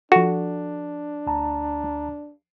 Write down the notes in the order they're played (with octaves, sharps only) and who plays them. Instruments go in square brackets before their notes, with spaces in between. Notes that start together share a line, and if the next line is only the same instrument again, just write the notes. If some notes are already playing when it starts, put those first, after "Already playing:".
[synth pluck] F3 A4 [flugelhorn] D4 [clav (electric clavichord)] F#4
[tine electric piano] D2 A5 A#5